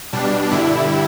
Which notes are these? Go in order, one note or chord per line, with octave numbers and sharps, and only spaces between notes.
B2 G3 D4
G2 D3 G3 E4